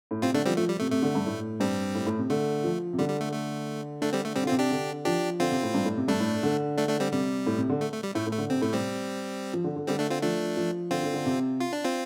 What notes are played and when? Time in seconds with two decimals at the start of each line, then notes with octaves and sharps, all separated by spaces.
0.11 A2
0.22 C3 C4 F4
0.34 D3 A3 D4
0.46 F3 G3 C4
0.57 F3 A3
0.69 G3
0.80 C3 A3
0.91 C3 A3
1.02 D3
1.15 G2
1.26 A2
1.60 G2 G3 C4
1.95 A2
2.06 A2
2.18 C3
2.30 D3 A3
2.64 F3
2.93 C3
2.98 D3 G3
3.09 G3
3.21 A3
3.33 A3
4.02 D3 A3 D4
4.13 G3 C4
4.25 A3
4.36 C3 G3 C4
4.44 D3
4.47 C4 F4
4.51 C3
4.59 D4 G4
4.71 D3
5.05 F3 D4 G4
5.40 D3 C4 F4
5.51 C3
5.63 A2
5.74 G2
5.85 A2
5.97 C3
6.08 G2 A3 D4
6.20 A2
6.43 D3
6.78 A3 D4
6.89 A3 D4
7.00 G3 C4
7.12 C3 G3
7.46 A2
7.58 C3
7.69 D3
7.81 A3
7.92 A3
8.03 G3
8.15 A2 A3
8.27 A2
8.33 A3
8.38 D3
8.50 C3 C4
8.61 A2 A3
8.73 C3 G3 C4
9.53 F3
9.64 D3
9.76 D3
9.87 D3 G3 C4
9.99 A3 D4
10.10 C4 F4
10.22 F3 A3 D4
10.57 F3
10.91 D3 C4 F4
11.03 D3
11.14 D3
11.25 C3
11.60 F4
11.73 D4
11.84 C4 F4